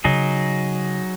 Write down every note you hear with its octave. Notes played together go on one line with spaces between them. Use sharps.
C#3 F#3 D#4 G#4